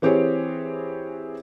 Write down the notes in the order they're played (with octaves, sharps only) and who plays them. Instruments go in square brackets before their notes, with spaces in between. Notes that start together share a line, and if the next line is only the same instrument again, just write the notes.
[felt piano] E3 C4 G4 G#4 C#5